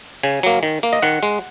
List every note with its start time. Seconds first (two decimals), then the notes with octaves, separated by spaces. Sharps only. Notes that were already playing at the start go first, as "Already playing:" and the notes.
0.23 C#3 G#5
0.43 F#3 A#3
0.63 D#3
0.83 A#3
0.93 D#5
1.02 D#3 F#5
1.23 G#3